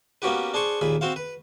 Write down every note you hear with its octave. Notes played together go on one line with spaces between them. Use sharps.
A#3 B3 C#4 F#4 G4 B4
D4 G#4 C5 C#6
D#2 A#2 G#4 B5
C4 F#4 C5 F5
B4